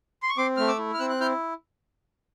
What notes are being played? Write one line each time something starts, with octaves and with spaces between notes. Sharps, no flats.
C6
C#6
C4 C6 D6
A3 F6
D6 E6
E4
F6
C4 E6 F#6
F#6
E4 F6 G6